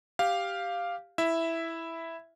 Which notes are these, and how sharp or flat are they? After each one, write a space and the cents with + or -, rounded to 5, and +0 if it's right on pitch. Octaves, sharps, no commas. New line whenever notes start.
G4 +0 F5 +0
E4 +0 E5 +0